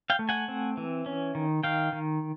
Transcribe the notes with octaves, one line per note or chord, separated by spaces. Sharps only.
F5 G5
A3
F#5 G#5
C4
E3
C#4
D#3
D#3 F5 G5
D#3